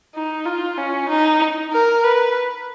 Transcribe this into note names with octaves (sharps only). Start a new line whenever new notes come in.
D#4
F4
C#4
D#4
A#4
B4